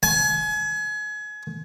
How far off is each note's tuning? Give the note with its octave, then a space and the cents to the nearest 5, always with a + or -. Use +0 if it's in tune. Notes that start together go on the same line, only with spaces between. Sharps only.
G#5 +30